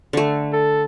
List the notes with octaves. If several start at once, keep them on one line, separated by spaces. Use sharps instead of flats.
D3 A3
A4